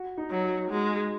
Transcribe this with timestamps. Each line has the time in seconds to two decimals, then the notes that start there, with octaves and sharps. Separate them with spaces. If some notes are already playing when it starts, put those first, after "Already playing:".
Already playing: F#4
0.17 D#4
0.31 F#3
0.44 F#4
0.70 G#3 F#4